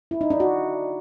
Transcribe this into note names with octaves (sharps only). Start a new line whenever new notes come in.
E4
D#4
D4
F#4